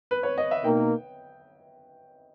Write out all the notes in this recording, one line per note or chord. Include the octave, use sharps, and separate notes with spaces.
B4
C#5
D#5
E5
B2 A#3 D#4 A#4 G5